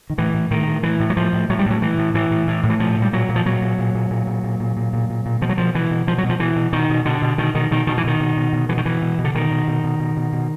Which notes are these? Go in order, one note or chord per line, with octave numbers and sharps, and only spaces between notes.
D#3
A2 E3
A2
A2 D#3
A2
A2 E3
A2
F#3
A2 F3
A2
A2 F#3
G3
A2 F#3
A2 E3
A2
A2 E3
A2
A2
A2
E3
A#2 F3
A#2
G3
A#2 F#3
A#2
F3
A#2 F#3
A#2
A#2
A#2
A#2
A#2
A#2
A#2
A#2
A#2
A#2
A#2
B2 F3
F#3
B2 F3
B2 E3
B2
B2 F3
F#3
B2
F3
B2 E3
B2
B2 D#3
B2
B2 D3
B2
B2 D#3
B2 D#3
B2 D#3
B2 D#3
E3
B2 D#3
B2
B2
B2
B2 E3
D#3
B2 E3
B2
B2
D3
B2 D#3
B2
B2
B2
B2
B2
B2